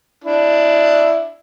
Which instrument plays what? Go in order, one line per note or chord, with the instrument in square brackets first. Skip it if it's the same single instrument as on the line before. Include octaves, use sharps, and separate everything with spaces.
[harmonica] D4 E4